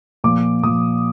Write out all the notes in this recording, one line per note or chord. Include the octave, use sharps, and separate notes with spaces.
A#2 F3 D6
A#2 F3 D#6